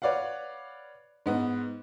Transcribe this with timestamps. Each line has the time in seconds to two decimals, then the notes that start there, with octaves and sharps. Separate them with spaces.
0.02 B4 C#5 D5 F5 F#5
1.26 G#2 B3